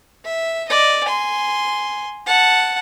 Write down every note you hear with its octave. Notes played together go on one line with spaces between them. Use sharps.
E5
D5 D#5
G#5 C6
F#5 A5